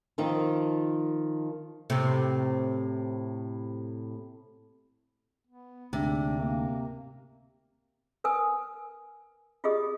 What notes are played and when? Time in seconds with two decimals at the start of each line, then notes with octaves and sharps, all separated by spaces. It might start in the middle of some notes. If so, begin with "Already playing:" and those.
0.18 D#3 F3 C4 D#4
1.90 A2 C3
5.47 B3
5.93 D2 G#2 C3 D4
6.38 A#3
8.24 A#4 B4 G#5 D#6
9.64 F4 G4 G#4 D#5 D#6